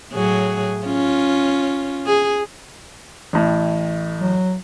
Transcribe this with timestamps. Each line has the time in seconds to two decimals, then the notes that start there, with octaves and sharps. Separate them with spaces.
0.12 A2 F#3 G#4
0.86 C#4 F4
2.06 G#4
3.33 A1 A2
4.20 F#3